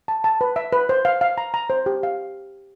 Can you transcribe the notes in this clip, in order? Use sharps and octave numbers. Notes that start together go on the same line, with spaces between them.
A5
A5
B4
E5
B4
C5
F5
F5
A#5
A#5
C5
G4
F5